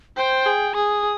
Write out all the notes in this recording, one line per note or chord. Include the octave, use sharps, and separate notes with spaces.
C5 G5
G#4
G#4 D#6